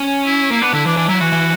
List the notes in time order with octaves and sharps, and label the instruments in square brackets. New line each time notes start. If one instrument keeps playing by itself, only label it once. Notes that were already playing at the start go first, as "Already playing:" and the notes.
Already playing: [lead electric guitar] C#4
[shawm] E4
[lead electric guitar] A#3 [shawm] E4
[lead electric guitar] B3 [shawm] D4
[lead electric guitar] D3 [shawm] E4
[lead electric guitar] E3 [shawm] D4
[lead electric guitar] E3 [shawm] D4
[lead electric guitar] F#3 [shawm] E4
[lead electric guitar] E3 [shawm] F#4
[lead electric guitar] E3